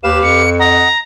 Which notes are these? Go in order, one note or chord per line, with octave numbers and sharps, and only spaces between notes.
D#2 G4 B4 F5 E7
F2 C#7
D#5 F#5 A#5